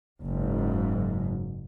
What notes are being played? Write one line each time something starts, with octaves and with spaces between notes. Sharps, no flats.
F#1 G#2